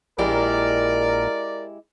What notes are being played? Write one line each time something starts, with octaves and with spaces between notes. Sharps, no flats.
A#1 G#3 E4 G4 A#4 D5